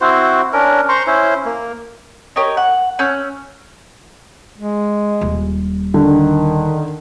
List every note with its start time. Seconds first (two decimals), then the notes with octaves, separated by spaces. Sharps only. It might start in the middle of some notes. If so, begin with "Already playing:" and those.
0.01 C4 E4 F#4 C5
0.53 C#4 D4 A#4
0.89 C5 A#5 C6 C#6
1.07 C#4 E4 C5
1.46 A#3
2.36 G4 A#4 C#5 D#5
2.57 F#5
2.99 C#4 E6 F#6 G6
4.58 G#3
5.21 D#1 G3
5.94 D3 D#3